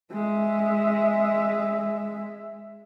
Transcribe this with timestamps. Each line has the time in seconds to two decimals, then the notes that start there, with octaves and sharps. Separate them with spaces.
0.13 G#3 E5